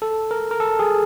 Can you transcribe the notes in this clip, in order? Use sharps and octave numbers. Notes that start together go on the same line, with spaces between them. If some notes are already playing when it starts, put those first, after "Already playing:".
A4
A#4
A#4
A4
G#4